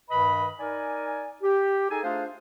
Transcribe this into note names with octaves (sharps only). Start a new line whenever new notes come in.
G2 D#3 B4 D#5 B5
D#4 A#4 D5 G#5
G4
D#4 G#4 A4 G#5
A3 D4 F4 G#4 C5 F5